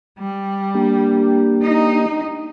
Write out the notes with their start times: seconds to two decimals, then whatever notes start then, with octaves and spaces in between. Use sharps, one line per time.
0.19 G3
0.75 A#3 D4 G4
1.63 D#4